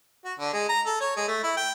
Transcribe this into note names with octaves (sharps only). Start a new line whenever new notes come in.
F#4
D3
G#3
A#5
A4
C#5
G#3
A3
E4
G5